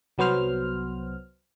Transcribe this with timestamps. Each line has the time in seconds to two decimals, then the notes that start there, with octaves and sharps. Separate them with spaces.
0.18 C2 F#3 B3 C5 F6